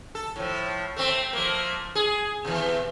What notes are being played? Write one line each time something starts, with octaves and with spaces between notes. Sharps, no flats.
A4
A2 F3
A3 C4
F3 A3 A#3
G#4
B2 E3